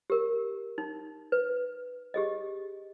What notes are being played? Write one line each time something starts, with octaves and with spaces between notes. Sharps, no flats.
G4 A#4
D#4
B4
G4 G#4 D#5